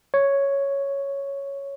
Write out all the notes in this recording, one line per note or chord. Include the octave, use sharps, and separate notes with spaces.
C#5